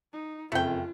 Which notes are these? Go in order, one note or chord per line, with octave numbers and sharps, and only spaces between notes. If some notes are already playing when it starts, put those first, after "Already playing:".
D#4
F#1 F2 A3 F4 G5